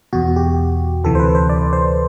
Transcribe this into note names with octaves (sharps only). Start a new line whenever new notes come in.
E2 B2 F#4
G4
D2 C3 E3 A4
C5
B4
C5
D5
C5